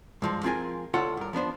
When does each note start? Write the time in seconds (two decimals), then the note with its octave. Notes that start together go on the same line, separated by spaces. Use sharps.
0.22 G2 F3 G#3
0.43 F3 C4 F4 G#4 A#4 G#5
0.94 D2 F4 A4 C#5 F#5
1.17 G2 A#4
1.33 F3 B3 D4 C5